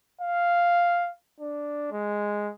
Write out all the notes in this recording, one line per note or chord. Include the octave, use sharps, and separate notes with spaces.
F5
D4
G#3